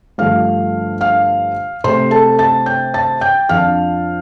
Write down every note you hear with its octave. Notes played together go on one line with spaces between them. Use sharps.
G2 D3 F3 A3 F5 F6
F5 F6
C3 A3 C4 C5 C6
A4 A5
A5 A6
G5 G6
A5 A6
G5 G6
F2 F3 D4 F5 F6